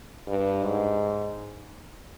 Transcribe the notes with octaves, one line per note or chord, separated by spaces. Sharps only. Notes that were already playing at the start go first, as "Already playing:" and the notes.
G2
G#2